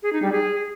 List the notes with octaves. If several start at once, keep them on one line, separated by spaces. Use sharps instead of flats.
G#4
D#4
G3
G#4